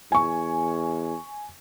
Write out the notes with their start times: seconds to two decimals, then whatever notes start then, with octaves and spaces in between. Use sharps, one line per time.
0.12 E2 G#5 C#6